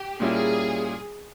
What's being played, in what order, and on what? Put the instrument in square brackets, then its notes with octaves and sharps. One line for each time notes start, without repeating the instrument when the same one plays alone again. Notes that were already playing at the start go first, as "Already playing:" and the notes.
Already playing: [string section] G4
[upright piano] A#2 G3 A#3 C#4 E4 [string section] G#4